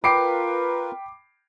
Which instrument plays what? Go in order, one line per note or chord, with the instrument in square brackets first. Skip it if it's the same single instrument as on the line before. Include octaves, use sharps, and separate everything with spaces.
[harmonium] F4 A#4 B4 [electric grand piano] G5 B5 [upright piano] D6 C7 D7